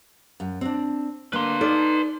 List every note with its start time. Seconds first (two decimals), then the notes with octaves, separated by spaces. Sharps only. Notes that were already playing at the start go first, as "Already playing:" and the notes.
0.40 F#2
0.61 C4 D4
1.33 D3 A#3 B4 C6
1.61 D#4 A4 D5